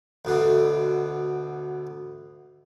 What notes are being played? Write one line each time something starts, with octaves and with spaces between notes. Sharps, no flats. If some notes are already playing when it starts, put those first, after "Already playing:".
D2 B2 D3